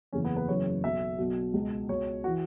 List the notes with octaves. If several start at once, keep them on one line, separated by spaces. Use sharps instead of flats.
F#1 E2 C#3 E3 C#4
B3
B4
F#1 F#2 C#3 E3 C#5
B1 B2 E5
B1 B2
C#2 B2
C#2 B2 C#5
F#4
E3